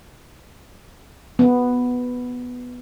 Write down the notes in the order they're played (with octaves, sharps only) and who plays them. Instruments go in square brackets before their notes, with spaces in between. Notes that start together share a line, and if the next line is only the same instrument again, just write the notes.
[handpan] B3